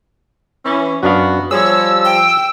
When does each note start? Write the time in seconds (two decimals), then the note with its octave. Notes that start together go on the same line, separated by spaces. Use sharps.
0.65 E3 C#4
1.03 F#2 B3 D4 F#4 F5
1.51 F3 G3 G#4 C#5 E6
2.05 G5